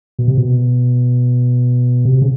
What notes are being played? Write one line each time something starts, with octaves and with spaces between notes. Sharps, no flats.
B2
C3
B2
C3
C#3